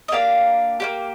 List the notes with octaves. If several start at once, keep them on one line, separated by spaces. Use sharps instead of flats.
D#5
A#3 D4 G4 F5
A#3 D4 G4